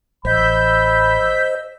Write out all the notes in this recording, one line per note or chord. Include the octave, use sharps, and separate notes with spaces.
A1 C5 D#5 B5 E6 G6 B6